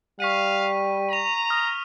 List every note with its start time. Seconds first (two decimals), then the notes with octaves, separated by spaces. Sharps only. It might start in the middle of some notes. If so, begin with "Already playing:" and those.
0.20 G3 F5 C#6 B6 D#7
1.09 A#5 D#7 F7
1.50 D#6 F6 F7